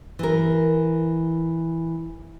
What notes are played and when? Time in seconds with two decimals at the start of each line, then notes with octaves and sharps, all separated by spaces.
0.19 E3 A#4